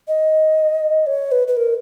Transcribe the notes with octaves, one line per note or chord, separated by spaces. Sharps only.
D#5
C#5
B4
B4
A#4